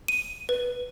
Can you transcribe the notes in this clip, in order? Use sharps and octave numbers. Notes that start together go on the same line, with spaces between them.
D#7
B4